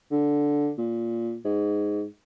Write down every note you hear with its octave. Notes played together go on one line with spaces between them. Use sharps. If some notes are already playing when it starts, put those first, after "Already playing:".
D3
A#2
G#2